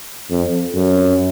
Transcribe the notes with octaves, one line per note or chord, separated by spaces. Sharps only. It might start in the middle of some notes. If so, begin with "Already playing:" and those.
F2
F#2